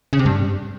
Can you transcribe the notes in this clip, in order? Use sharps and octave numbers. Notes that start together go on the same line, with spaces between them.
C#3
C3
G2